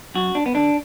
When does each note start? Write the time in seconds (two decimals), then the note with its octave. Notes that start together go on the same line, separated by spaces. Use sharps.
0.15 F#2 F#4
0.35 D4
0.46 B3
0.55 D3 D4